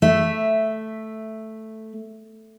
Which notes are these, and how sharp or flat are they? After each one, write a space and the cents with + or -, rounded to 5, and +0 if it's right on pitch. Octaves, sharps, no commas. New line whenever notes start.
A3 +0 E5 +0